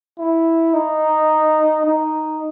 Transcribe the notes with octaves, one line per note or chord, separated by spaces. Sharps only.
E4
D#4
D#4